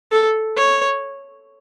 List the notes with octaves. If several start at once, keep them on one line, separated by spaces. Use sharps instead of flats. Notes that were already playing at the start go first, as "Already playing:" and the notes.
A4
C#5